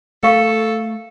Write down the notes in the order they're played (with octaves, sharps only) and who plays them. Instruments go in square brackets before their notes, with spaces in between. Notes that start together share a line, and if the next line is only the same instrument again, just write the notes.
[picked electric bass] A3 [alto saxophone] A4 [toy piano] A#4 F5 C#6